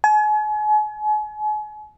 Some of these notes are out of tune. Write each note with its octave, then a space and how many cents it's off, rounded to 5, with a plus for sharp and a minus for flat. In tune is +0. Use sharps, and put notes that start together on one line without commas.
G#5 +40